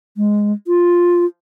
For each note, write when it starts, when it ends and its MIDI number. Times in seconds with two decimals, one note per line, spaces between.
0.17 0.52 56
0.67 1.25 65